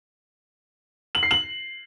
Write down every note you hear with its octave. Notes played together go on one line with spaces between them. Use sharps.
F#7
C7
F#7